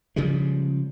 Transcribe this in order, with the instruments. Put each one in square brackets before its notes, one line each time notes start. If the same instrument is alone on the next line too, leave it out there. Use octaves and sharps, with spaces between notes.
[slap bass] C#3 F3 G3 G#3